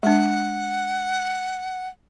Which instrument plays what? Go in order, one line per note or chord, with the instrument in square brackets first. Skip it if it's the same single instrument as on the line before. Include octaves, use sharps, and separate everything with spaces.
[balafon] G#3 D4 [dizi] F#5